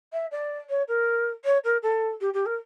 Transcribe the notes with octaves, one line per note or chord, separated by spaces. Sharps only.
E5
D5
C#5
A#4
C#5
A#4
A4
G4
G4
A#4